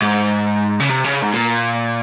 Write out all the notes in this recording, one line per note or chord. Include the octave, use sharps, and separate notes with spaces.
G#2
C#3
C3
C#3
G#2
A#2